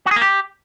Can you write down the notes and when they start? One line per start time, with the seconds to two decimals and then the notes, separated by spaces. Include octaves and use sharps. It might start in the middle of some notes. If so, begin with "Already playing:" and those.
0.06 F#4
0.11 G#4
0.16 A#3
0.21 G4